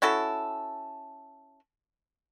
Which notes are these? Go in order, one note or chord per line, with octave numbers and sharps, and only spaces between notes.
C#4 E4 F#4 A4